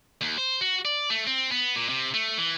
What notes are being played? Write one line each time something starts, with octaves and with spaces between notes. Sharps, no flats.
D#2
C5
F#4
D5
A3
C4
B3
A#2
C3
A3
E3